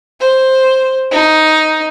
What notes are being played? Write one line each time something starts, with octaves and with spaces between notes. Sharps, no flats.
C5
D#4